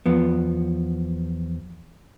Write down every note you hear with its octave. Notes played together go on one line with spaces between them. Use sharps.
E2 F3 B3